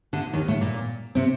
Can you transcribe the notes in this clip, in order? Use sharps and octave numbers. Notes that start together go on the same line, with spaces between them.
D2 D3
D#2 D#3
A2 A3
A#2 A#3
C3 C4